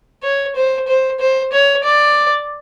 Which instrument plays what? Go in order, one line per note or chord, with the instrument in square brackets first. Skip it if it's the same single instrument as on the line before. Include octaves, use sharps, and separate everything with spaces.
[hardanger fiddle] C#5
C5
C5
C5
C#5
D5